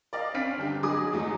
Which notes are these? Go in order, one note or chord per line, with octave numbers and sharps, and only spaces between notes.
D5 D#5 F5
C4 C#4 F6 B6 C7 D7
G1 D3 G4
F#3 G#3 G#4 D6 D#6
E2 G#2 F#3 G#3 A3